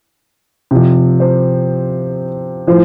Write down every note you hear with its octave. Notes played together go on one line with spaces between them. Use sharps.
C3 F3
C5
A2 F3 C5